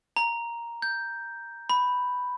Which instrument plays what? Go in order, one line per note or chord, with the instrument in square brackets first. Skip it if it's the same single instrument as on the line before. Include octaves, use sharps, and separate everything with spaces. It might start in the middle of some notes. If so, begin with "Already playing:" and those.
[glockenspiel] A#5
G6
B5